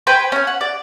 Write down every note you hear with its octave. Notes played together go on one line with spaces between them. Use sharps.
B4 C5 G5 G#5
C#4 G#5
F#5
D5